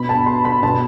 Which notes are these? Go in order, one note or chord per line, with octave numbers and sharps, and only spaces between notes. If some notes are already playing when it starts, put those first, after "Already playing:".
Already playing: B2 B5
A5
C6
B5
B2 A5